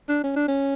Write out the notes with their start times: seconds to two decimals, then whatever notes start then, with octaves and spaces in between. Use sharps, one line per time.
0.09 D4
0.24 C#4
0.36 D4
0.48 C#4